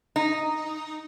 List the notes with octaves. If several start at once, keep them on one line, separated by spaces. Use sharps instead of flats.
D#4